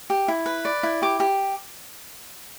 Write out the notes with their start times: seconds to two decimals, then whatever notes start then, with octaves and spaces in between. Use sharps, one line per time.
0.10 G4
0.28 E4
0.46 B4
0.65 D5
0.83 E4
1.02 G4 D6
1.20 G4